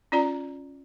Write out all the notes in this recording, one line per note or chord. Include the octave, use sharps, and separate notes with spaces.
C#4 F4 D5 A#5